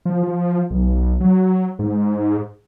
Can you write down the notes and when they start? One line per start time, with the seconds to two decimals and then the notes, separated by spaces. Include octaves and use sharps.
0.05 F3
0.23 F3
0.70 B1
1.20 F#3
1.79 G#2